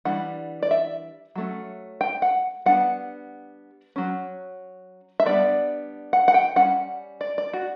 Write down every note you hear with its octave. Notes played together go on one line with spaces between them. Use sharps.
E3 G3 D4 F#5
D5
E5
F#3 A3 C#4
G5
F#5
G3 B3 D4 F#5
F#3 C#4
E5
G3 B3 D4 D5
F#5
F#5
G5
G3 C#4 F#5
D5
D5
F#4